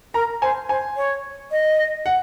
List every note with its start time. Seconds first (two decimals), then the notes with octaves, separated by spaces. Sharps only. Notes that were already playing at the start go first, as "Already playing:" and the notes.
0.14 A#4 A#5
0.42 C5 G#5
0.69 C5 G#5
0.96 C#5
1.51 D#5
2.06 F#5